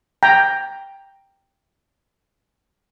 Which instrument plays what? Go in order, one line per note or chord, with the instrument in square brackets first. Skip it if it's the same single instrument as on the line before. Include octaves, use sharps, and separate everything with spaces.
[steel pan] G5 A#5